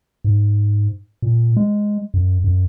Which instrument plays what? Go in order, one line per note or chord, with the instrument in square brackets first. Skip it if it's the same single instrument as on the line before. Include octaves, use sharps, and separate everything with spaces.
[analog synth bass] G#2
A#2
G#3
F#2
F#2